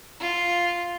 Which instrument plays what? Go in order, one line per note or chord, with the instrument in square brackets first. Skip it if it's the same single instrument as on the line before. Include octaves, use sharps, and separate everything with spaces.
[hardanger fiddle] F4